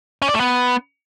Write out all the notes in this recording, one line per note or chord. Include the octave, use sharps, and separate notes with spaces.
C#4
D5
A3
B3